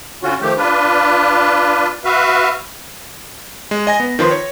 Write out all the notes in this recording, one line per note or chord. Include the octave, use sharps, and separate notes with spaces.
D3 C#4 F4 F#4
D#3 F3 A3 G4
D4 F4 B4
F#4 B4 E5 F5
G#3
D#5 G#5 A#6
B3
D#3 F3 B4 C6
C#5